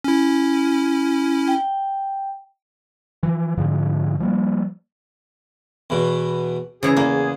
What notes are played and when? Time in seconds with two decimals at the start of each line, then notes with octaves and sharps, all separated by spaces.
0.04 C#4 E4
1.48 G5
3.23 E3 F3
3.58 G#2 D3 F3
4.20 F3 G3 A#3
5.90 E2 B2
6.83 C#3 E3 G#4 A#5
6.97 E2 A#3